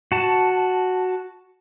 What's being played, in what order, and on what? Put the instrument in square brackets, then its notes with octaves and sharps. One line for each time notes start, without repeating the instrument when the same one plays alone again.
[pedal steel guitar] F#4 A5